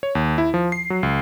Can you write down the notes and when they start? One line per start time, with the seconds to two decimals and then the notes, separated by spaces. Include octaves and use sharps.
0.03 C#5
0.15 D#2
0.38 E4
0.54 F3
0.72 C7
0.90 F#3
1.03 C#2